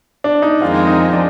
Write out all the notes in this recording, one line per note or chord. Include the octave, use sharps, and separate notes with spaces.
D4
D#4
F2 D#3 G#3 C4 F4
D#4
D4